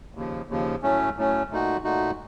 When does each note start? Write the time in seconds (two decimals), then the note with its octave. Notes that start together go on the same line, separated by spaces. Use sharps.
0.15 D#2 C#3 F3
0.49 D#2 C#3 F3
0.82 A2 F#3 A3 C#4
1.17 A2 F#3 A3 C#4
1.50 A#2 A3 D#4 F#4
1.84 A#2 A3 D#4 F#4